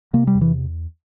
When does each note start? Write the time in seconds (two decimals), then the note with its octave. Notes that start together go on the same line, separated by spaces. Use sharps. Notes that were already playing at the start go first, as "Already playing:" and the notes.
0.13 C3 A#3
0.27 G3
0.35 E2
0.41 E3